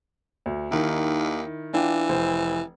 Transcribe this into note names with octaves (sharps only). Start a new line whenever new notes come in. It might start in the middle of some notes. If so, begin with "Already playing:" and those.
D2
D#2 D#3 E4
E3 D4 F4 G5
F1 C5